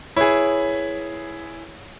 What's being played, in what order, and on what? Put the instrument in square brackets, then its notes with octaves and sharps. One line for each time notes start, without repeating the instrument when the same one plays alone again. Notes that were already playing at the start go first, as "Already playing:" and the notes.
[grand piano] E4 G#4 [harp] B4 C#5